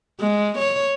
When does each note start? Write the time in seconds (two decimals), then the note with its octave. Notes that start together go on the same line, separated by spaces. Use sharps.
0.20 G#3
0.58 C#5